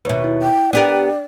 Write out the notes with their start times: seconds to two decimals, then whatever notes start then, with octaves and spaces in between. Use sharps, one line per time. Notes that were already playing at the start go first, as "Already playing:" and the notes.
0.05 D#2 B2 B4 C#5 E5
0.24 E4
0.42 G5
0.73 B3 D4 G4 A#4 D5 G5